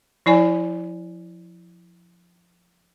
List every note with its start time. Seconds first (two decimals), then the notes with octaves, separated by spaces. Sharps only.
0.26 F3 E4 D5 G#5